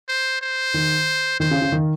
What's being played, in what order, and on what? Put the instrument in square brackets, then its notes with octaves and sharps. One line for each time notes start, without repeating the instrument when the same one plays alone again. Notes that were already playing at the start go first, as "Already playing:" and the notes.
[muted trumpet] C5
C5
[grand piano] D#3
[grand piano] D#3 [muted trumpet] C5
[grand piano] C#3
C#3
D#3